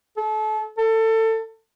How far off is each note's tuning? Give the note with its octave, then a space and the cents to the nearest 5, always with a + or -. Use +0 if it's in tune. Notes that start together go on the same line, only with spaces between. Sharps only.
A4 -30
A4 +25